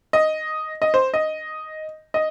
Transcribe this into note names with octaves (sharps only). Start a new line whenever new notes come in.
D#5
D#5
C5
D#5
D#5